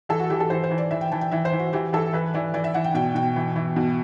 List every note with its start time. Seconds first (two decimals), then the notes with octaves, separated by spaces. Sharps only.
0.09 E3 A4
0.19 F#4
0.30 E3 G4
0.40 A4
0.50 E3 C5
0.63 C5
0.71 E3
0.78 D5
0.91 E3 E5
1.01 G5
1.12 E3 A5
1.21 G5
1.31 E3 E5
1.45 C5
1.52 E3
1.59 F#4
1.73 E3 G4
1.93 E3 A4
2.13 E3 B4
2.33 E3 D5
2.54 E3 D5
2.64 E5
2.74 E3 F#5
2.84 G5
2.94 B2 G5
3.15 B2 G5
3.36 E3
3.56 E3
3.76 B2